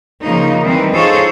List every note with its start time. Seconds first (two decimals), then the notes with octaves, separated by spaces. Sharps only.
0.23 C#3 F3 A#3 D#4
0.62 D#3 E3 G3 C4 D#4
0.92 D#4 F4 G#4 A4 C5 C#5